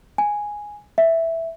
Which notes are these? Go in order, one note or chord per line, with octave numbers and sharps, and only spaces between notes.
G#5
E5